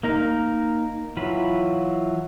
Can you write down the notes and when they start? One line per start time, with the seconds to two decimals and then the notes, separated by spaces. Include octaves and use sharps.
0.03 A#3 D#4 A#4
1.17 E3 F#3 F4 B5